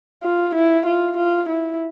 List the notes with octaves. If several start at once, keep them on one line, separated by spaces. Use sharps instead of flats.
F4
E4
F4
F4
E4